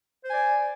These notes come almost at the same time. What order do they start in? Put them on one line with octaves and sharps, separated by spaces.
C5 G#5 D5